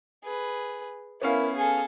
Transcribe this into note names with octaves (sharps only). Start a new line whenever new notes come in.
G#4 B4
B3 C#4 E4 A#4 F5
G#4 A4 G#5